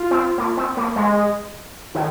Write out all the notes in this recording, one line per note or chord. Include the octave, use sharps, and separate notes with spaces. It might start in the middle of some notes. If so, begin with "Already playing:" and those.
Already playing: F4
C4
A#3
C4
A#3
G#3
D#3